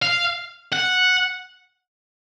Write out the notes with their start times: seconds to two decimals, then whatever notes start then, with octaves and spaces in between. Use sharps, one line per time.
0.02 F5
0.73 F#5